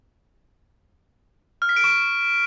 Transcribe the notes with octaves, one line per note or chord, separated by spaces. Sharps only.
F6
B6
D7
C#6